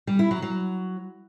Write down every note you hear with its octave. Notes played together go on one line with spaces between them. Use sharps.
G3
E4
F#3
F#3